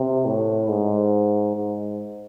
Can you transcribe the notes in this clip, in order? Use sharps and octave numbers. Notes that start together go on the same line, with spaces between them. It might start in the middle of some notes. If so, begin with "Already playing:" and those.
Already playing: C3
A2
G#2
G#2